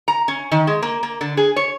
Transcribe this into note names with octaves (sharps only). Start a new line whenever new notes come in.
A#5
C#4
D#3
G#3
A#3
A#3
D3
G#4
C#5